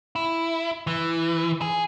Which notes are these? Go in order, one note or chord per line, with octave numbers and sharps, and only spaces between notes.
E4
E3
G#4